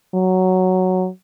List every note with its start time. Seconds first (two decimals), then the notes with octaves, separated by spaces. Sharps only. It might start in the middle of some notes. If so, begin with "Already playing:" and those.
0.15 F#3